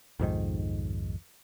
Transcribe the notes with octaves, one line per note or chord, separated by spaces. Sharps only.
B1 F2 G#2 D#3